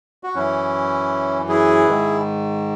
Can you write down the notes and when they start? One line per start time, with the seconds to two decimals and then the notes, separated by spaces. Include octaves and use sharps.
0.23 F#4
0.35 F#2 E3 C#4 E4
1.49 E4 G#4
1.87 G#2 D#3